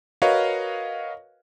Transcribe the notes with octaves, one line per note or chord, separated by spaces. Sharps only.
F#4 A#4 B4 C#5 D#5 F5